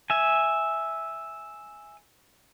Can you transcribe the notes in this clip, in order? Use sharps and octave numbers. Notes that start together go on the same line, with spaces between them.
E5 G#5